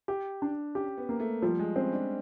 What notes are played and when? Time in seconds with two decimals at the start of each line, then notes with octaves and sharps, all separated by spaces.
0.08 G4
0.42 D4
0.75 C#4 G4
0.98 B3
1.09 A#3
1.20 A3
1.42 F3 G3
1.59 G#3
1.76 C4 C#4
1.92 D4